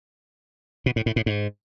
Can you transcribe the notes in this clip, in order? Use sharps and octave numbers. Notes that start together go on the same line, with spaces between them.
B2
A2
A2
A2
G#2